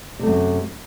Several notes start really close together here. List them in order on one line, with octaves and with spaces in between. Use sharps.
C3 A3 F#2